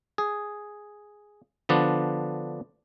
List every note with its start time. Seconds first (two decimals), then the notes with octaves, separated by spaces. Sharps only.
0.18 G#4
1.69 D3 F3 B3 D4